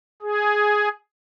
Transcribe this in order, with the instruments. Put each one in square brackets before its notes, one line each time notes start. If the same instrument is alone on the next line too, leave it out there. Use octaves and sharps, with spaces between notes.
[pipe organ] G#4